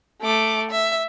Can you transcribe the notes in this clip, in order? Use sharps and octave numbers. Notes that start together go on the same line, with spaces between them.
A3 D6
E5